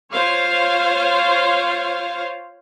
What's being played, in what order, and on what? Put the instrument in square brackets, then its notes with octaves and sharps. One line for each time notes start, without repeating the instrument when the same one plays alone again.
[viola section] F4 C5 C#5 F5